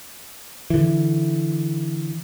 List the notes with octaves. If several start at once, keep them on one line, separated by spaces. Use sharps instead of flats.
D3 E3